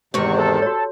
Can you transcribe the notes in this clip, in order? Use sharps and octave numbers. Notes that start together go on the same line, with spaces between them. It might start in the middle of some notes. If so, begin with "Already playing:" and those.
E2 G#2 C3 D#3 C4 C#6
A4 C5 A5
F#4 G4 C#5